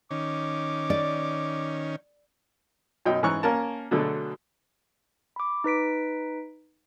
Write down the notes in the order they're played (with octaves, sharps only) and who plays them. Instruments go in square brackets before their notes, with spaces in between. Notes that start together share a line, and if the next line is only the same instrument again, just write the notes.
[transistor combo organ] D#3 C#4 [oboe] D6
[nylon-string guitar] D5
[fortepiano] F#2 B2 D#4 G5
G#2 E3 C#4 A#5 C#6 F#6
A#3 C#4 A#4 A5
B2 D3 F#3 A3 G#4
[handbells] B5 D6
D#4 B4 B6 D7